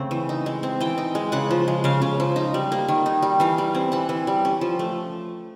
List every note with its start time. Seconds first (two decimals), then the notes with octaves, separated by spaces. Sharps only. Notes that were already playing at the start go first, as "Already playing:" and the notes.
Already playing: C#3 A3 C4
0.11 E3
0.29 D#4
0.46 G#3
0.63 C4
0.80 E3 G5
0.98 D#4
1.15 G#3
1.32 C#3 F#5
1.51 F3
1.68 G#3
1.84 C#3 F5
2.02 C#3
2.20 F3
2.36 D#4
2.54 G3
2.72 A#3
2.88 D#3
3.06 D#4
3.22 G3
3.40 E3 F5
3.58 G3
3.75 C4
3.92 E3 F#5
4.09 E3
4.27 G3
4.45 C#4
4.61 F3
4.79 A3